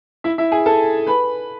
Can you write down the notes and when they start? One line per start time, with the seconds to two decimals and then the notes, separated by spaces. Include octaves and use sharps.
0.24 E4 E5
0.38 E4 E5
0.52 G#4 G#5
0.66 A4 A5
1.07 B4 B5